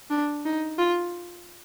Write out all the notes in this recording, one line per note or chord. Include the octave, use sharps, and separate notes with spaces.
D4
D#4
F4